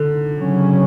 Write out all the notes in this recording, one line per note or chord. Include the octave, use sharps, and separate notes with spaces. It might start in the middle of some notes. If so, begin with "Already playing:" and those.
Already playing: D3
C#3 F#3 C#4